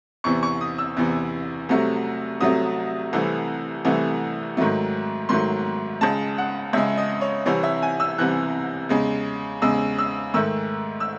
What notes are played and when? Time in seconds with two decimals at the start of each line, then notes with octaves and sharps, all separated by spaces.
0.24 E2 C3 E3 C#6
0.43 C#6
0.61 D#6
0.78 E6
0.97 E2 C3 E3
1.69 C2 C3 F#3 A3
2.40 C2 C3 F#3 A3 D#6
3.13 C2 C3 E3 A3
3.85 C2 C3 E3 A3
4.57 G#2 D#3 F#3 A3
5.29 G#2 D#3 F#3 A3 C6
6.01 C#2 C#3 G#3 A5
6.38 F#5
6.73 C#2 C#3 G#3 E5
6.97 D#5
7.21 C#5
7.46 C2 C3 E3 C#5
7.63 E5
7.82 G#5
8.00 E6
8.18 C2 C3 E3 F#6
8.89 E2 C#3 G#3
9.62 E2 C#3 G#3 E6
9.99 E6
10.34 G#2 D#3 A3 E6
11.00 E6